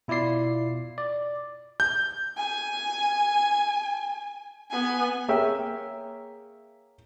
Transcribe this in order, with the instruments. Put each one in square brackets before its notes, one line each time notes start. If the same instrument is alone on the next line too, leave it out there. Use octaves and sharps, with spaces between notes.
[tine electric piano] B2 E4 F4 D5 C7
D5
[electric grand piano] G6
[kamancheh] G#5
B3 G#5
[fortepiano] A#3 G#4 C#5 E5 G5